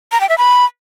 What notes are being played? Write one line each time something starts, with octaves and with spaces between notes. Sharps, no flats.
A#5
G5
E5
B5